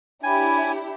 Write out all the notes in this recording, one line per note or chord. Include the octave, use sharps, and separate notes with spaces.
D4 E4 G4 C#5 G5 G#5 B5